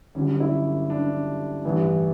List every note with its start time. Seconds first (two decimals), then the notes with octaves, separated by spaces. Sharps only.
0.15 G1 G2 D3 F#3 C#4
0.40 E4
0.90 D4
1.65 A1 G2 E3